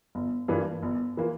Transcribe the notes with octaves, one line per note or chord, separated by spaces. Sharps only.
G1
G2 E3 A#3 F4
G1
E3 A#3 F4